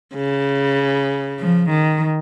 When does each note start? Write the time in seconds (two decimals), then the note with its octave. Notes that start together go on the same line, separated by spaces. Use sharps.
0.16 C#3
1.39 F3
1.71 D#3